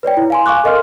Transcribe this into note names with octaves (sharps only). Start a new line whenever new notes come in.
B4 C#5 D5 G5
E4
F5 G#5 C6
F5 G#5 C#6 D6 F#6
A4 A#4 D#5 F5 C6 F6